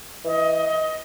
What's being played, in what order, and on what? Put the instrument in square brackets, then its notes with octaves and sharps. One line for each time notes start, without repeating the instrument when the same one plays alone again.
[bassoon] E3 [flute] D#5